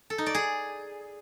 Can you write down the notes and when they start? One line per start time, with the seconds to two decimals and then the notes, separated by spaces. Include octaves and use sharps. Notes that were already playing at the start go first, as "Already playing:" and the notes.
0.10 A4
0.18 D#4
0.26 D5
0.35 G#4